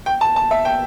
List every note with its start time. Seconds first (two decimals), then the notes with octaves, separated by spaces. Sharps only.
0.06 G5
0.21 A5
0.36 A5
0.51 E5
0.65 G5